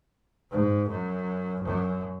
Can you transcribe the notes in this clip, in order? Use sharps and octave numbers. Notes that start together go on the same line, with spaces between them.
G#2
F#2
F#2